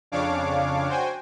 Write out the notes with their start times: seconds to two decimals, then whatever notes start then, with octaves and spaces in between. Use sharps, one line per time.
0.12 F2 C#3 D4 C#5 F5 D6
0.88 F#4 C5 G5 G#5